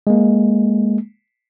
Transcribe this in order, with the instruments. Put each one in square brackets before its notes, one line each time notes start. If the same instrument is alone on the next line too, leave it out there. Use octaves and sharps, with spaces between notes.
[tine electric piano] G#3 A#3